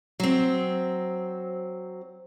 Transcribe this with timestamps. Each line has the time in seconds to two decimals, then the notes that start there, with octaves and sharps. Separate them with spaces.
0.20 F#3 C4